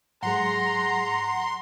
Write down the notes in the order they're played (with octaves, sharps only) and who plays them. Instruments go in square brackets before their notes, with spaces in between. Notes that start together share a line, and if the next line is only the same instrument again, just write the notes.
[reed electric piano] G#2 F#3 G#4 [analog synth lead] F#5 [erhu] A#5 [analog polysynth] C6